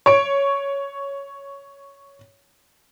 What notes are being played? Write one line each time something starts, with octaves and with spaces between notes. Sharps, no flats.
C#5 C#6 D7